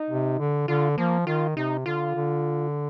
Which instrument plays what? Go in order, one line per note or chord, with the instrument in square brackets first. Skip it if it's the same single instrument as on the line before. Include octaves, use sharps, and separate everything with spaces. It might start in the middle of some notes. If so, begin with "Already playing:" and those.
Already playing: [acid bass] D#4
[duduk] C3
D3
[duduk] D3 [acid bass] F4
[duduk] F3 [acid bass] A#3
[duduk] D#3 [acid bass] F4
[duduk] C3 [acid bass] D#4
[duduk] D3 [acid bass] F4
[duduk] D3